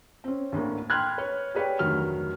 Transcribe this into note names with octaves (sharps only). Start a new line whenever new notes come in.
C4 C#4
D2 A2 D3 A#3
G5 B5 C6 F6 F#6 G#6
B4 C#5
G4 G#4 B4 C#5 D5 G5
F1 D2 D#3 F#3 F6